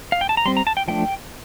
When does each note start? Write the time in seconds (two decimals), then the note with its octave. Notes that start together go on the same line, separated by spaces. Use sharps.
0.12 F5
0.21 G5
0.29 A5
0.37 A#5
0.46 G3 C4 C6
0.57 A#5
0.67 A5
0.77 G5
0.88 F3 A3 D4 G5